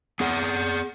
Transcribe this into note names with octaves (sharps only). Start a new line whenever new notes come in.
B3 G#4 F#5